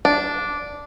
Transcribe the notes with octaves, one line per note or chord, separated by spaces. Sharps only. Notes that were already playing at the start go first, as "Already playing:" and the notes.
D4